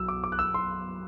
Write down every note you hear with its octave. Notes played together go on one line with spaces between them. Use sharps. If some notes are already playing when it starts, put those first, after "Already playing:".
Already playing: B1 B2 F#3 E6
D6
D6
F#6
E6
C6